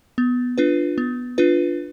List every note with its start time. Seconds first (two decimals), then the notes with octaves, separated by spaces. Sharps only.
0.18 B3
0.58 D4 F4 B4
0.98 B3
1.38 D4 F4 B4